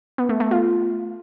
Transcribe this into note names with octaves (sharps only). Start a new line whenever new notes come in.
B3
A3
A3
F4